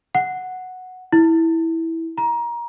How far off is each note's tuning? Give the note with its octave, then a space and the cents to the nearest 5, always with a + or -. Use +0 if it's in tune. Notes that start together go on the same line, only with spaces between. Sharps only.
F#5 -5
E4 -10
A#5 +25